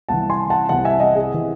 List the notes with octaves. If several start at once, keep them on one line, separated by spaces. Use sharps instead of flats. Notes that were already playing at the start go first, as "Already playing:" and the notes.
C2 C3 E3 F#5 A5
G#5 C6
F#5 A5
C2 C3 E3 F#5 A5
E5 G#5
D#5 F#5
G#4
C3 E3